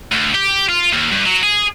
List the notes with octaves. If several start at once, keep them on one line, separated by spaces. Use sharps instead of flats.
D2
G4
F4
D#2
G2
F#3
G#4